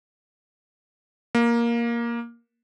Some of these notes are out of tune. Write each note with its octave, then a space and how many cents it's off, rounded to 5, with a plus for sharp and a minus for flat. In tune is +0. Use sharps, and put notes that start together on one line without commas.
A#3 +10